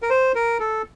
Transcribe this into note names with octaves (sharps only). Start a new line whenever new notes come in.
A#4
C5
A#4
A4